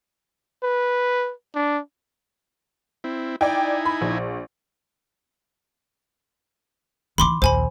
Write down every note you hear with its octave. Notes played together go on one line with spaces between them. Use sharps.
B4
D4
C4 E4
D#4 E4 D5 G5 G#5
B5
A#1
E3 D#4 B5 C6 D6
A#1 D#2 C5 G#5 B5